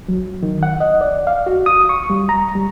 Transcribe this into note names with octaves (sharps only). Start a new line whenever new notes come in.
F#3
D#3
F#5
D#5
D5
F5
F#4
D#6
C#6
G3
A#5
G3